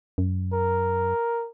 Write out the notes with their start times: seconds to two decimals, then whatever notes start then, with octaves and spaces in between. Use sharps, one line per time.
0.18 F#2
0.53 A#4